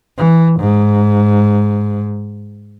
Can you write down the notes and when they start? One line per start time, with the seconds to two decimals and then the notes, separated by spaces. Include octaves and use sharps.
0.18 E3
0.60 G#2